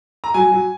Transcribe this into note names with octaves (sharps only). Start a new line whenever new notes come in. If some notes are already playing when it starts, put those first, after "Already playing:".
A#5
F#3 G#5
F#3